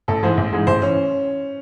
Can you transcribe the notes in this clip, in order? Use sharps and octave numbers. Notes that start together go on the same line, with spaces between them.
A1 A4
G#2 E3 G#3 C5
A1
G#2 E3 G#3
A1 C5
E3 C#4